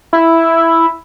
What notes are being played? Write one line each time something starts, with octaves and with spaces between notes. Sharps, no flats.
E4